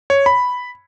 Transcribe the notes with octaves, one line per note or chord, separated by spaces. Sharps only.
C#5
B5